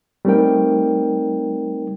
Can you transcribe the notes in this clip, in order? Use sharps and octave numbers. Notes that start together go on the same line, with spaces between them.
G3 A3 C4 D#4 A#4 G5